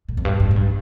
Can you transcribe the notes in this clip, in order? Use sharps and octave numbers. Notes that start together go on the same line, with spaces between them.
A2
F2
G2
G2
A2
G2